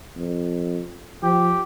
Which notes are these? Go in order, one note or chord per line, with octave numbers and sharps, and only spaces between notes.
F2
F3 G4